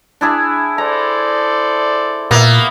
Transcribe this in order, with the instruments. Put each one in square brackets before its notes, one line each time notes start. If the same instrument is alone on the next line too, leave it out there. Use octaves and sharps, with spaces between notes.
[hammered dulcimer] D4 E4 G#4
[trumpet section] A4 C5 D5 [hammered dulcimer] A#5
[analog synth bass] A#2 [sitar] A#3 [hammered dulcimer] B3 E5